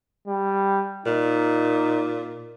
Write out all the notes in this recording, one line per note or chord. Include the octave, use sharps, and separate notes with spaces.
G3
A#2 D#4